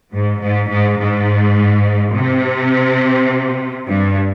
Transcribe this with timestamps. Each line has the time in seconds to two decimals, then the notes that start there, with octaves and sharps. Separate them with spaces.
0.11 G#2
0.40 G#2
0.69 G#2
0.98 G#2
2.15 C3
3.89 G2